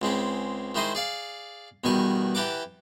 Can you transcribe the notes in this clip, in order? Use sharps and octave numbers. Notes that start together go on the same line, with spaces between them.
C#2 G#3 C4 B5
D#3 G#3 E4 C5 D#5 D#6
G#4 D5 F5
E2 B2 D#3 G3 G#5 C#6
E3 G4 A4 F#5 A#5 D6